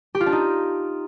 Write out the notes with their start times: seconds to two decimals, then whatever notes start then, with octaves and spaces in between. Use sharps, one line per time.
0.15 G4
0.20 F4
0.26 D4
0.32 D#4